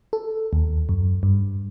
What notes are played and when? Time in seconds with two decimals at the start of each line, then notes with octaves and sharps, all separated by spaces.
0.13 A4
0.53 D#2
0.89 F#2
1.23 G2